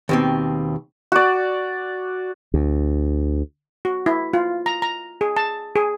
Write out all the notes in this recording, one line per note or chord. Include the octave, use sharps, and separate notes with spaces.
D#2 B2 C4
F#4 D5
D2
F#4
E4
F4
A#5
A#5
G#4
A5
G#4